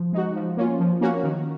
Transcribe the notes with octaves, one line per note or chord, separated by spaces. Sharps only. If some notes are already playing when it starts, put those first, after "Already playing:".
Already playing: F3
G#3 D#4 F#4
F3
A#3 C#4 F4
F3
A#3 C#4 F#4
D#3